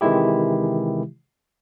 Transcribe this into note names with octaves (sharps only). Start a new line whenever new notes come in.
C3 D#3 E3 G#3 E4 G4